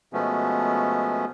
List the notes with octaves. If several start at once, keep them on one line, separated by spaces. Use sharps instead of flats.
B2 F3 G#3 A3 B3 C#4